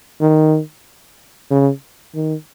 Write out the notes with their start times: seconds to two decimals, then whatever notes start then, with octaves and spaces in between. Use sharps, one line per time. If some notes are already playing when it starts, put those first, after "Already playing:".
0.21 D#3
1.50 C#3
2.15 D#3